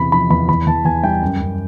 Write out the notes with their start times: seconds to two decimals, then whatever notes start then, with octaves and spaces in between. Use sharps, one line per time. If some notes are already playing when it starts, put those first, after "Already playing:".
Already playing: E2 C3 B5
0.12 F3 B5
0.30 E2 B5
0.48 E2 B5
0.67 E2 A5
0.85 E2 G#5
1.03 G3 G5
1.22 F#2
1.40 F#2